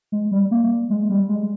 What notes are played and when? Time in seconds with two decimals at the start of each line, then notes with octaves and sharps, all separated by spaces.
0.12 G#3
0.31 G3
0.51 A#3
0.90 G#3
1.10 G3
1.29 G#3